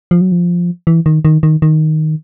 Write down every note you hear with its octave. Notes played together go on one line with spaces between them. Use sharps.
F3
F#3
F3
E3
D#3
D#3
D#3
D#3